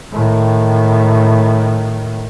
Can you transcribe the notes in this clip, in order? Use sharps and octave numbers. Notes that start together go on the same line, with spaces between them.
A2 D#3